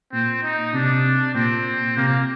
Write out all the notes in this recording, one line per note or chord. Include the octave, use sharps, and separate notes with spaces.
A#2 C4
D#4
C3 D4
A#2 C4
C3 A#3